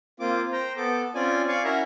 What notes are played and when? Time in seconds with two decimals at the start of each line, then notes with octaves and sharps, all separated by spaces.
0.20 A#3 C4 F4 D6
0.52 C5 G5 A#5
0.77 B3 A4 D6
1.15 C4 C#4 F4 D5 G#5
1.48 D5 F5 G#5 C#6
1.64 C#4 E4 F#4 A#4 E5 A#5